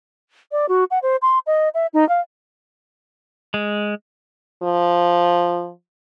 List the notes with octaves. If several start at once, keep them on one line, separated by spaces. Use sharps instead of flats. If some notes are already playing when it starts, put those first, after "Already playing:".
D5
F#4
F#5
C5
C6
D#5
E5
D#4
F5
G#3
F3